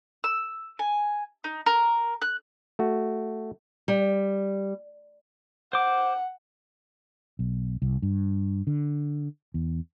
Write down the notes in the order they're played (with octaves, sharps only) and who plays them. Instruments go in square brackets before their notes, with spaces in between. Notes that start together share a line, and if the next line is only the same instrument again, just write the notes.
[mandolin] E6
G#5
D#4
A#4
F#6
[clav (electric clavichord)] A3 F#4
[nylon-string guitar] G3
[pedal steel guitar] C5 D6 [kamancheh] F#5
[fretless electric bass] B1
C2
G2
D3
E2